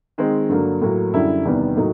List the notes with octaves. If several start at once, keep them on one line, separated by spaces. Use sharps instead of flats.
D#3 G#3 C4
G2 D3 F#3 A#3
A2 F#3 A#3
F#2 D3 G3 E4
E2 C3 D#3 G3 B3
A2 F#3 A#3 D#4